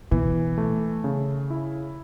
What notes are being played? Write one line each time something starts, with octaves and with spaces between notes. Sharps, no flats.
B2 E3
A3
C#3
E4